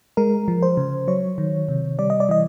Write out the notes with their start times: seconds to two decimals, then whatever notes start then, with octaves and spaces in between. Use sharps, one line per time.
0.17 G#3 A#4
0.48 F3
0.62 C5
0.77 C#3
1.08 F#3 C#5
1.38 D#3
1.69 C3
1.99 G3 D5
2.10 D#5
2.20 D5
2.29 E3 D#5